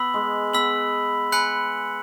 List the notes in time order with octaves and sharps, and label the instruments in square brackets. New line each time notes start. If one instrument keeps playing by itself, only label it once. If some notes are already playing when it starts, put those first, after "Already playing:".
Already playing: [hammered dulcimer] B3 [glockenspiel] E6 B6 F#7
[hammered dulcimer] G#3
[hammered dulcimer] B3 [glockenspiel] E6 B6 F#7
[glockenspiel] G#5 B5 F#6 C#7 F#7